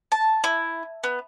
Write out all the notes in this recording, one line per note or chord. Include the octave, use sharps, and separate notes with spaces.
A5
E4
B3